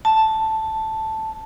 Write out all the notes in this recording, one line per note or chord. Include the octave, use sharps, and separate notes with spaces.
A5